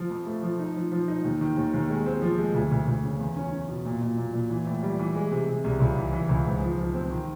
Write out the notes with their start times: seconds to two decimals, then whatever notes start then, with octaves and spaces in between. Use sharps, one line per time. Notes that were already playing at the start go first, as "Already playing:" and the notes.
Already playing: F3
0.10 F2
0.26 A3
0.42 F3
0.59 D#4
0.76 F3
0.92 F3
1.08 D#4
1.24 D#2
1.41 D#3
1.56 D#2
1.74 D#2
1.90 G#3
2.06 C4
2.22 F3
2.38 G#3
2.55 D2
2.71 D2
2.87 D2
3.04 C#3
3.19 E2
3.36 C#4
3.52 C#4
3.69 B2
3.85 A#2
4.01 A#2
4.18 A#2
4.33 A#2
4.50 E3
4.66 A2
4.83 G3
4.99 E3
5.15 G#3
5.31 C3
5.47 C3
5.64 C2
5.80 C#2
5.96 E3
6.13 E3
6.29 C#2
6.45 G#2
6.61 F3
6.78 F3
6.94 C4
7.11 D#3